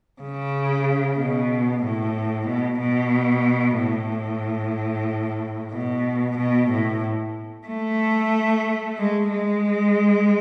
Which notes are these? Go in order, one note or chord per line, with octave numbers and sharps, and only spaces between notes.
C#3
B2
A2
B2
B2
A2
B2
B2
A2
A3
G#3
G#3